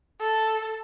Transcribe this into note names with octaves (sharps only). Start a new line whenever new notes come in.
A4